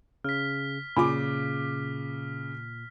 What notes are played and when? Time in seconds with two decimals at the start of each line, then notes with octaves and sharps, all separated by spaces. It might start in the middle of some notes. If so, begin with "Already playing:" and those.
0.24 C#3 F6 B6
0.97 A#2 C#3 F4 G#5 B5 D6